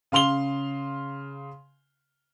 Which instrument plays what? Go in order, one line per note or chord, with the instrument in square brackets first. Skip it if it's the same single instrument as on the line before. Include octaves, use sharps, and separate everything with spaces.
[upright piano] C#3 F5 C6 F7 G7